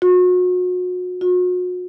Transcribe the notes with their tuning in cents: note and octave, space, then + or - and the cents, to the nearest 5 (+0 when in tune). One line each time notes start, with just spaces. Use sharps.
F#4 -35
F#4 -40